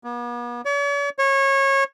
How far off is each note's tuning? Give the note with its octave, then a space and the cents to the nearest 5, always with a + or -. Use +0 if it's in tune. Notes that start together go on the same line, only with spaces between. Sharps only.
B3 -45
C#5 +45
C#5 -25